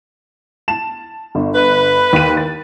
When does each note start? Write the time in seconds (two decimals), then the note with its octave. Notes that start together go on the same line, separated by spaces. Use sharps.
0.68 A5 E7
1.35 G1
1.55 B4
2.13 D#2 D#7
2.37 A6